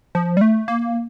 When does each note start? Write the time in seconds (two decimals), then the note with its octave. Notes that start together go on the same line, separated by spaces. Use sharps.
0.15 F3
0.37 G3
0.41 A3
0.68 A#3